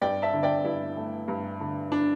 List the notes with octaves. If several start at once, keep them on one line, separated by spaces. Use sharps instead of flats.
G2 D5 G5
E5 A5
D3
D5 G5
G2 E4
A3
G2
D3
D4